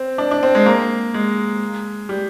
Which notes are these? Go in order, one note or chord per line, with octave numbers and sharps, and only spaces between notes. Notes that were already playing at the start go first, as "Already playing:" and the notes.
Already playing: C4
D4
D4
C4
G#3
A#3
G#3
G3